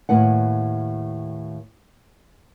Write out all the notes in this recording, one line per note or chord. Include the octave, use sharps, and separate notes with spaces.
D#2 A2 B4 F#5